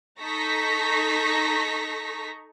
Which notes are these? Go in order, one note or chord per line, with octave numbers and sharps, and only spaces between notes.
D#4 A4 A#5 C#6 A#6 B6